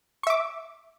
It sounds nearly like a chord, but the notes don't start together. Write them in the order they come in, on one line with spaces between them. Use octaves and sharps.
C#6 E5 D6